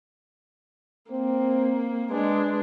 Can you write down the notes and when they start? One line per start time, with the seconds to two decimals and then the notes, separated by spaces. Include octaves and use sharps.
1.11 A#3 C4
2.11 G#3 D4 B4